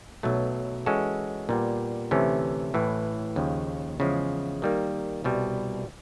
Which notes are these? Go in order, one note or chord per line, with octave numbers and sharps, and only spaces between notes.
B1 B2 F#3 A3
E3 G#3 C#4 F#4 A4
A#2 G3 B3
D2 C3 E3 A3 C#4
A1 A2 E3
D#2 C#3 F3
E2 C#3 F3 G#3
D#3 G3 A#3
C2 B2 G3